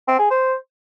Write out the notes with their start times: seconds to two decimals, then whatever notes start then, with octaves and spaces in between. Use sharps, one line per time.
0.08 C4
0.19 G#4
0.31 C5